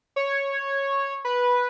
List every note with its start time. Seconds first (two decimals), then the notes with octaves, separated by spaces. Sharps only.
0.16 C#5
1.25 B4